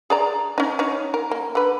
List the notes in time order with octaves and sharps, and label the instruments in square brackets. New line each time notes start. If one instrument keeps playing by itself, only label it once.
[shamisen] G#4 D5 A#5
C#4 D#4
C#4 D#4 C#5
A#4
A#3
D3 B4